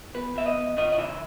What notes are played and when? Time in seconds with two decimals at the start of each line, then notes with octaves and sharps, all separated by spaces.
0.14 E2 B4
0.36 E2 E5
0.46 D#5
0.57 E2
0.77 C#3 D#5
0.92 D#5
0.98 E3 E5